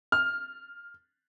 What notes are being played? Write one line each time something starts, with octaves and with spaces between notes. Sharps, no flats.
F6